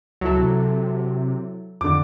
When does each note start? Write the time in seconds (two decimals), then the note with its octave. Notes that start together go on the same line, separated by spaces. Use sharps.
0.21 C#2 F#3 E4 A4
0.38 C3
1.81 F2 D3 D6